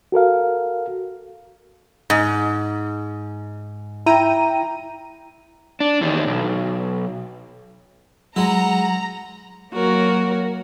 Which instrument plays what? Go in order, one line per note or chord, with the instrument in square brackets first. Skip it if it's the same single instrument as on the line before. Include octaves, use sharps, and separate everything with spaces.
[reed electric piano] F#4 A4 A#4 F5
[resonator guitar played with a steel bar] G#2
[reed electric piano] E4 [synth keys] G5 A#5 D#7
[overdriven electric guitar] D4
E2 D#3
B1
[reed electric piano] F#3 [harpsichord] G#3 E4 [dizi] F#5 [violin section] A#5
[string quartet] F#3 A#3 F#4 A#4 C#5